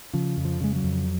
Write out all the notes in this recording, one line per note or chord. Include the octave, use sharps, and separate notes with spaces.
C#3 F3
F2
F3
C#3 G#3
F#3
F2